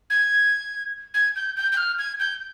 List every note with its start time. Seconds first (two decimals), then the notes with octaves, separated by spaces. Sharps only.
0.10 G#6
1.14 G#6
1.36 G6
1.56 G6
1.72 G6
1.77 F6
1.99 G#6
2.20 G6